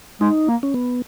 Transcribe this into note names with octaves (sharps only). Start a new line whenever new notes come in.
G#3 D#4
A#3
C#4
B3